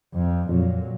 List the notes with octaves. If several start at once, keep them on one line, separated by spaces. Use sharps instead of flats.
F2
F2 A#2 F#3